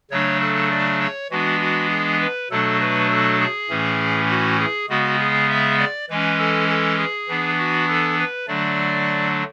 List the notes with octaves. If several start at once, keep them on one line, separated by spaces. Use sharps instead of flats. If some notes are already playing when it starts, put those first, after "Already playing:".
C#3 F#3 A3 D4 C#5
A4
D5
C#5
E3 G#3 B3 D4 F#4
F#4
G#4
B4
B2 F#3 A3 D4 A4
B4
A4
G#4
A2 E3 A3 C#4
F#4
G#4
C#3 G#3 B3 F#4
G#4
E5
D5
E3 G#3 C#4 B4
A4
A4
G#4
E3 B3 D4
F#4
A4
B4
D3 F#3 A3 D4 D5